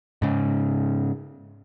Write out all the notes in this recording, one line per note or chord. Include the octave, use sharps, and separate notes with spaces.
G#2 C#3